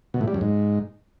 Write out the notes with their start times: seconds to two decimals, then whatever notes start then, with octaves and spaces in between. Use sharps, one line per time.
0.14 B2
0.21 A2
0.28 G3
0.34 F#2
0.41 G#2